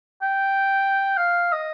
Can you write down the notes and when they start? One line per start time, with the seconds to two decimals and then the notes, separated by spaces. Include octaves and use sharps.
0.22 G5
1.17 F5
1.52 D#5